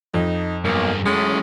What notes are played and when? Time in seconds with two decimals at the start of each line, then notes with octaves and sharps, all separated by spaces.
0.14 F2 D#4
0.65 B1 G2 A#3 G#4
1.06 F#2 A2 G#3 C#4 G#5